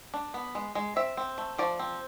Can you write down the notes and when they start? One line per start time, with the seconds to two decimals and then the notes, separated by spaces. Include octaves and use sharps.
0.14 D4
0.34 B3
0.55 G#3
0.75 G#3
0.96 C4 E5
1.17 C4
1.38 A3
1.59 F3 D5
1.79 C4